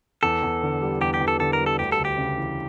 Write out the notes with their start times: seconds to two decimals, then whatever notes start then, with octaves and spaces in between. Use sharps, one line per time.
0.23 E2 A4
0.43 E2
0.63 D3
0.82 G3
1.01 E2 G4
1.14 G4
1.21 E2
1.28 A4
1.40 D3 A4
1.53 A#4
1.60 G3
1.66 A4
1.79 D2 G4
1.92 A4
1.99 D2
2.05 G4
2.18 C#3
2.38 E3